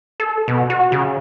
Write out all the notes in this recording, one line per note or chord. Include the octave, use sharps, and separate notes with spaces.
A4
B2
F#4
C#3